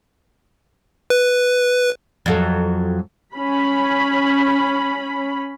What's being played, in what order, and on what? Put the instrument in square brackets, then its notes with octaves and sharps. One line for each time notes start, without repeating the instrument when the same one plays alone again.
[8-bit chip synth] B4
[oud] F2 F#3 A4
[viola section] C#4 B5